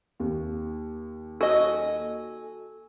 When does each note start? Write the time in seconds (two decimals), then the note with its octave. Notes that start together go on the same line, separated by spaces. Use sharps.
0.20 D#2
1.41 F#4 A4 D#5 G#5